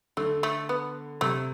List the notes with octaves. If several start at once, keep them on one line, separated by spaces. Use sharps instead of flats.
D3 A3
A3
B3
C3 A3